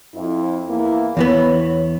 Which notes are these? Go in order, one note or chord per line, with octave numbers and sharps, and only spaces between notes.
F2 E4
E2 A#3 E4
E2 E3 B3 C#5